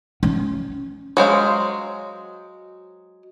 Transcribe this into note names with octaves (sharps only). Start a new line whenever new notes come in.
C#4
F#3 G#3 C5 F5